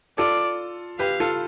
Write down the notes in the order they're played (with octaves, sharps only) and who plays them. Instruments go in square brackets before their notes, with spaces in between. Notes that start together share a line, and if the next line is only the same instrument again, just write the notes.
[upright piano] F4 A4 [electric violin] D5
[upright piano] G4 B4 [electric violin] F5
[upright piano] F4 A4